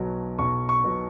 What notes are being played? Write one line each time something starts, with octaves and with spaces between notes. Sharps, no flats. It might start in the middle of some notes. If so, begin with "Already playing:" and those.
Already playing: B1 B2 F#3
B1 C#6
C#6
B2 F#3